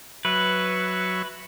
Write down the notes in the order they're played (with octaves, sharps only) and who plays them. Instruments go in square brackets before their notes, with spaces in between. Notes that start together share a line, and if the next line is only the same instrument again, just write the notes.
[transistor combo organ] F#3 E5 C#6 [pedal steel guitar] B4